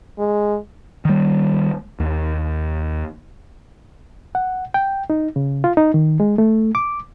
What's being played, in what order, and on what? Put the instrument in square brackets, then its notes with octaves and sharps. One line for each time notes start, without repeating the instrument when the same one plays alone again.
[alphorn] G#3
[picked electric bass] D#3 G3
D#2
[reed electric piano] F#5
G5
D#4
C#3
F4
D#4
D#3
G#3
A3
D6